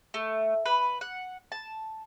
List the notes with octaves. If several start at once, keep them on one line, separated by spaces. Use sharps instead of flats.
A3
B4
F#5
A5